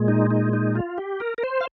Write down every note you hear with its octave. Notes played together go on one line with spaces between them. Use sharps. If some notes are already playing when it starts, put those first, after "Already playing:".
Already playing: A#2 G#3
D#4
D#4
D#4
F4
G4
A#4
A#4
C5
F5